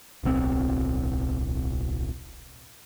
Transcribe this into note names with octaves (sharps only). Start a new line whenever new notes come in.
D1 B1 C4